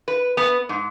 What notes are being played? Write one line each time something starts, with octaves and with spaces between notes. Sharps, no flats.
B4
B3
G#2